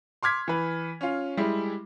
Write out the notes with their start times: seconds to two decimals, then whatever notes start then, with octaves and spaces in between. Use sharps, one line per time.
0.23 C6 D6 F6 G#6 B6
0.48 E3 B4
1.01 C#4 F4
1.37 G3 G#3 E4